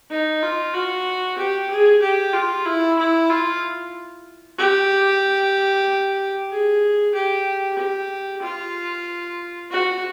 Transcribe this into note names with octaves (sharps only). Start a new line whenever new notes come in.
D#4
F4
F#4
G4
G#4
G4
F4
E4
E4
F4
G4
G#4
G4
G4
F4
F#4